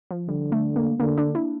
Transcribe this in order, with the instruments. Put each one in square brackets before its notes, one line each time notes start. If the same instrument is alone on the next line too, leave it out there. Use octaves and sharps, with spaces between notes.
[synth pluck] F3
[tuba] D3 [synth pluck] G3
[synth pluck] A3
A#3
[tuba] D3 [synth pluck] A#3
[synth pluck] D4
E4